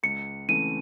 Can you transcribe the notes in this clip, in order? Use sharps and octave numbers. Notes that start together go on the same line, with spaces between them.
C#2 C#7
C#3 E3 A3 C4 D#7